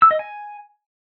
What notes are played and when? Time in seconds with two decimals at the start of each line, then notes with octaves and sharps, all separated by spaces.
0.02 E6
0.11 D#5
0.19 G#5